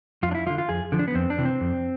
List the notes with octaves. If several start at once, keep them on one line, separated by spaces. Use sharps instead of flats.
F2 F4
D4
E4
F3 F4
D3
F4
F2 G#4
D3 F3
D4
B3
F2 C4
D4
C3 E3
C4
F2